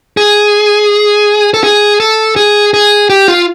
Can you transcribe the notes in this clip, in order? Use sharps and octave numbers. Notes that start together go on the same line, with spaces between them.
G#4
A4
G#4
A4
G#4
G#4
G4
F4